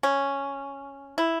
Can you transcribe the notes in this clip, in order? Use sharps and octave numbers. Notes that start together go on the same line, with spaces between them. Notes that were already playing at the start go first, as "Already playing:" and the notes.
C#4
E4